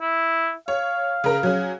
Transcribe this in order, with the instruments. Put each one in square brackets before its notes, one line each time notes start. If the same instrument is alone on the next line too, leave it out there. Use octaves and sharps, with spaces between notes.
[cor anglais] E4
[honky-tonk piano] C#5 [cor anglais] F5
[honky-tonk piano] C#3 A#4
F#3 C#4 G#4